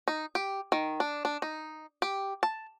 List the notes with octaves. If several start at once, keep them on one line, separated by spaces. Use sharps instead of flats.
D#4
G4
D#3
D4
D4
D#4
G4
A5